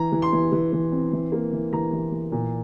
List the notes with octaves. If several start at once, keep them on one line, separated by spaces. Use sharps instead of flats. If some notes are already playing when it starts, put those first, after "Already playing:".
Already playing: E3 A#5
E3
C6
E3
E3
E3
C4
E3
A#3
E3
E3 A#5
E3
E3
A#2